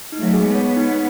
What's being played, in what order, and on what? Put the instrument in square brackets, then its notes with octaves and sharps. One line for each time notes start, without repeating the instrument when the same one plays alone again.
[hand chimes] D#4
[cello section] F#3 A3
[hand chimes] G#4
[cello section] G#3 B3
[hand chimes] C#5
D#4